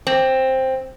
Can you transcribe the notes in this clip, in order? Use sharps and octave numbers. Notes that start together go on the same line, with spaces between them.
C4